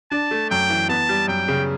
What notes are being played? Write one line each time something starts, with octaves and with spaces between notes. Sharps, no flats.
D4 A5
A3
F#2 G5
E3
B3 A5
G3
F#2 G5
C#3